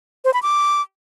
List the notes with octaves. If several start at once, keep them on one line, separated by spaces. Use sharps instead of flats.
C5
B5
D6